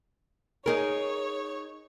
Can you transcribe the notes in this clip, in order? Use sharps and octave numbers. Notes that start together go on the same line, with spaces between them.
D#4 G#4 A#4 C#5